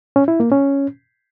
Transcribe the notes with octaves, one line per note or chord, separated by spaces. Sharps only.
C#4
E4
A#3
C#4